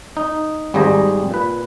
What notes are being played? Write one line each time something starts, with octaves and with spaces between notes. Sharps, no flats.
D#4
G#1 G3 C4 G#4 C5 A#5
A#2 B4